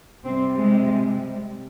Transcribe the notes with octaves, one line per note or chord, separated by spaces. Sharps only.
C3 G3 C4
G#3